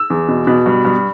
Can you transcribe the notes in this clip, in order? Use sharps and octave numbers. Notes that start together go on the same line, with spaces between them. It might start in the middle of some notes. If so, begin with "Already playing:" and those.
Already playing: E6
E2
B2
B2
G2
G2